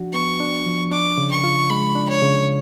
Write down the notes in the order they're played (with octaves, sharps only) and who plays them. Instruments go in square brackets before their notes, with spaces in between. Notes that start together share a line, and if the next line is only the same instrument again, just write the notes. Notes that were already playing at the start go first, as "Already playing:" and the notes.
Already playing: [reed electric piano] F3 D4 F#4
[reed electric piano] B3 [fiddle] C#6
[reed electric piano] D4
F3
[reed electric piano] D4 [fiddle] D6
[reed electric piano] C#3
[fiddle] C#6
[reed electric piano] F4
[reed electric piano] G#3 [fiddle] B5
[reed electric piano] D4
[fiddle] C#5
[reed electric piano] C#3